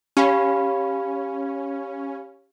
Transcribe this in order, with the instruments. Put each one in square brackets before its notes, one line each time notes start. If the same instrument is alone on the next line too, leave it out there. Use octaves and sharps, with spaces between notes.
[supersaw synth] C#4 [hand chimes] G4 F5 B5